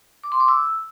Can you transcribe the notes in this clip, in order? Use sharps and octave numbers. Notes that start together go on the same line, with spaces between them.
D6
C6
D6
E6